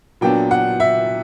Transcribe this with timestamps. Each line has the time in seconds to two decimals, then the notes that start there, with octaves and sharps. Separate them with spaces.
0.21 A#2 F#3 B3 D4 G5
0.51 F#5
0.80 E5